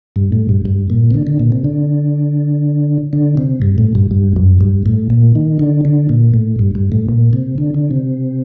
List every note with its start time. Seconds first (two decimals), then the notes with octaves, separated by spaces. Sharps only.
0.16 G2
0.32 A2
0.49 G2
0.65 G2
0.90 A#2
1.11 C3
1.14 D3
1.27 D3
1.40 A#2
1.52 C3
1.64 D3
3.13 D3
3.37 C3
3.62 G2
3.78 A2
3.95 G2
4.11 G2
4.36 F#2
4.61 G2
4.86 A2
5.10 A#2
5.35 D#3
5.59 D3
5.85 D3
6.09 A#2
6.34 A2
6.59 G2
6.75 G2
6.92 A2
7.09 A#2
7.33 C3
7.58 D3
7.74 D3
7.91 C3